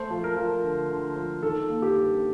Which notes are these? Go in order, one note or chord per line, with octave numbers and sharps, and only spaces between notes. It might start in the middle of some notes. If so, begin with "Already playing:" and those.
Already playing: A3 C5
F3
A#4
F3
D2
D2
F3
D#3 A4
A#3
G4
G2